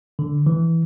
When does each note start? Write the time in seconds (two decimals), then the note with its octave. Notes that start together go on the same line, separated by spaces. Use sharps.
0.19 D3
0.46 E3